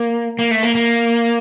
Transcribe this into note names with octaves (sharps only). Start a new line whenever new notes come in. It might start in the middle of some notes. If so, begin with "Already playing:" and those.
Already playing: A#3
A#3
A3
A#3
A#3